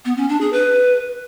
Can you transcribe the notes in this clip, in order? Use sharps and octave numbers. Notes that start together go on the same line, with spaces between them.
B3
C#4
D4
G#4
B4